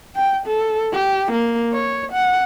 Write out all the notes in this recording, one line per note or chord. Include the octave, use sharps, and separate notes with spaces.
G5
A4
G4
A#3
C#5
F#5